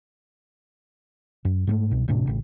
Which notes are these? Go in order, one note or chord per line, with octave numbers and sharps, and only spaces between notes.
F#2
G#2 G3 A3
C2 B2
E1 A2 C3 D4
A1 C#3